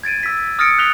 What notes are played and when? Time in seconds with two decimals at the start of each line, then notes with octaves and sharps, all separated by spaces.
0.03 G#6 A6 D7 D#7
0.23 E6 B6
0.59 D#6 F6 A6 A#6 C#7 D7
0.78 F#6 B6 F7 G7